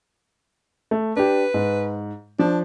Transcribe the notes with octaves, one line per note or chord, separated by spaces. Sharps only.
A3
D4 G4 B4
G#2
F3 D4